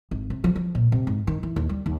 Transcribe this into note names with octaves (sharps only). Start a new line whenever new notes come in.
G#1
C3
F3
F3
A#2
C3
G#2
D#3
E3
D#2
G3
D#2